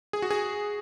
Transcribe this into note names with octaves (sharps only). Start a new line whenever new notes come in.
G#4
F#4
G#4